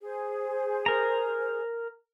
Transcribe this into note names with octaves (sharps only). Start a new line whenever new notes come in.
G#4 C5
A#4 A#5